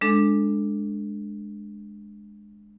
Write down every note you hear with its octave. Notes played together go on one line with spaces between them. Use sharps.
G#3 D4 A4